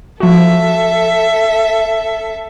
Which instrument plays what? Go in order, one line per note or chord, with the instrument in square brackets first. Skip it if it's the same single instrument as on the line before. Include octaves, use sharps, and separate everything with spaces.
[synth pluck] F3 F#4 [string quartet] A4 E5